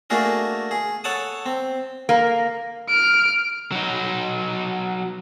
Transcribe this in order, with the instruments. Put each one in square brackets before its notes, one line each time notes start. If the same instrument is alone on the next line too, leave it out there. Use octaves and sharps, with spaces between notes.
[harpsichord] A3 A#3 D4 F#4 G#4 A#4
G#4
A4 C#5 F#5 A5 D#6
C4
[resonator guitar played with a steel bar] A#3
[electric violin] F6 D7
[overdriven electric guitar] F#3 D#4